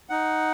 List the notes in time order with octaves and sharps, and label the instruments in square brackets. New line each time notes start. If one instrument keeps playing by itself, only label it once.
[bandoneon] D#4 F#5